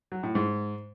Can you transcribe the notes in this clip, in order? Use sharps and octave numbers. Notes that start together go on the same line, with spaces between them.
F#3
A2
G#2